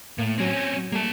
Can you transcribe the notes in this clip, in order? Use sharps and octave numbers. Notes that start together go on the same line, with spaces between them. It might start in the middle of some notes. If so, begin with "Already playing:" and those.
A2 A#3
F#3 C4 C#4 G#6 A#6
G6 G#6 A#6
F#3
G3 A3 A#3 A5